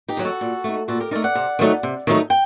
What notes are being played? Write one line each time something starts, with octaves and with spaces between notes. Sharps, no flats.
D#4 G4
D#3 F#3
F#4 A4
A#2
A3 D#4
A#2 F#4 A4
G4 A#4
A3 D#4 A#4 D5
D5 F#5
C3
D#3 F#3 A3 D#4
C3
D#3 F#3 A3 D#4
G5